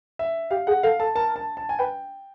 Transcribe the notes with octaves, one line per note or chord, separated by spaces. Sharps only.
E5
G4 F5
G#4 F#5
A4 F5
A4 A5
A#4 A5
A5
A5
G#5
B4 G5